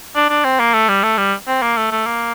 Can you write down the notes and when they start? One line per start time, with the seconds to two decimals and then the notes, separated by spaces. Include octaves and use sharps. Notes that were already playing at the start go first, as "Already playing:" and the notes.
0.15 D4
0.29 D4
0.44 C4
0.59 A#3
0.74 A3
0.88 G3
1.03 A3
1.18 G3
1.47 C4
1.62 A#3
1.77 A3
1.91 A3
2.06 A#3